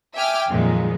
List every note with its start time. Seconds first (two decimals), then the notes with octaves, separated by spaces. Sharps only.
0.16 E5 G5 G#5 D6 F6
0.49 F2 A#2 D#3 F3 F#3 G#3